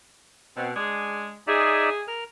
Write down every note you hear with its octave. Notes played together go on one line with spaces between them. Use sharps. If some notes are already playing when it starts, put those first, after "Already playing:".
B2 C4
G#3 D4 G#4
D#4 G#4 D5 E5
A#4 F6